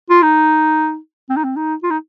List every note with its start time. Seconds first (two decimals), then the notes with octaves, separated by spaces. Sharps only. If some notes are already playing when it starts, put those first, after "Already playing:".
0.10 F4
0.23 D#4
1.30 C4
1.37 D#4
1.44 C4
1.56 D#4
1.83 F4
1.90 D#4